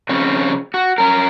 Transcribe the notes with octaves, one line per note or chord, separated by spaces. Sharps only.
F2 C#3 C4 C#4
F#4
C#4 A#4